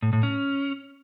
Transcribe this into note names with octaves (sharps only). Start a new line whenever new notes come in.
A2
A2
C#4